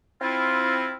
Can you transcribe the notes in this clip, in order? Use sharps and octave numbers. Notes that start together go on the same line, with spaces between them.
C4 E4 F4